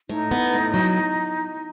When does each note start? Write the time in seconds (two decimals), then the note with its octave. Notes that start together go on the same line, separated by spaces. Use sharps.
0.09 A2 D#4
0.31 B3
0.53 A2
0.74 F#3